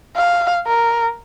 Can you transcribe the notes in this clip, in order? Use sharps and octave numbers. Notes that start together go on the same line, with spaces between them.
F5
A#4